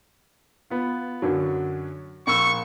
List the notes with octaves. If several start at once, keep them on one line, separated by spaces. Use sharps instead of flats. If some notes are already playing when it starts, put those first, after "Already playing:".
B3 F4
F#2 D3 F#3
A#1 C#6 E6